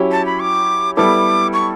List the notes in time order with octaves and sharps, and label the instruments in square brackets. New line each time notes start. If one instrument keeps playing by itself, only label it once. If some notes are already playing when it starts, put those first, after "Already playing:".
Already playing: [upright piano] F#3 C#4 E4 G4
[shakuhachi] A5
B5
D6
[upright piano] G3 B3 E4 A4 [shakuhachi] D6
[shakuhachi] C#6